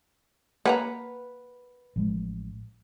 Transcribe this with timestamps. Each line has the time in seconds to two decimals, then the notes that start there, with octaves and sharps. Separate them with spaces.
0.66 A#3 B4 F#5 G#5 A#5
1.96 A1 F3 G#3